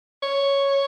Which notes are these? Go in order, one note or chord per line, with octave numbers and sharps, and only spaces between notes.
C#5